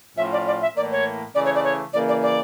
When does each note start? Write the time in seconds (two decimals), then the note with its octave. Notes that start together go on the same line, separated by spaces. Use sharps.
0.17 A2 F3 C#4 F4 E5
0.32 D5
0.46 D5
0.61 E5
0.76 A2 E3 A#3 D5
0.91 C#5
1.35 C#3 E3 A3 D5
1.45 C#5
1.55 D5
1.64 C#5
1.93 C#3 E3 A#3 D5
2.08 D5
2.22 D5